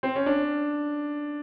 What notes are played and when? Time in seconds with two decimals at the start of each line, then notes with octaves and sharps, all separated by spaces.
0.03 C4
0.16 C#4
0.26 D4